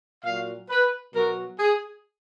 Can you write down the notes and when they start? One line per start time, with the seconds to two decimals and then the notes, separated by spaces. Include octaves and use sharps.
0.23 A#2 F#3 F5
0.69 B4
1.13 B2 F#3 A#4
1.60 G#4